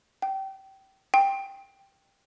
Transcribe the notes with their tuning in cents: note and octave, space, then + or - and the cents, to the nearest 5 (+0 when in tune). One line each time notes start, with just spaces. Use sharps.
G5 -25
G5 +5